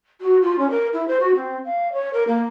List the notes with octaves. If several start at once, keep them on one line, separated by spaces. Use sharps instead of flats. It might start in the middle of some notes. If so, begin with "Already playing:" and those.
F#4
F4
C#4
A#4
E4
C5
F#4
C4
F5
C#5
A#4
A#3